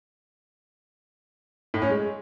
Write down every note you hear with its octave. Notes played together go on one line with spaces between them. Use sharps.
A2
C#4
G#3